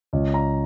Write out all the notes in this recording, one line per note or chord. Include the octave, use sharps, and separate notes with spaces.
C#2
A#5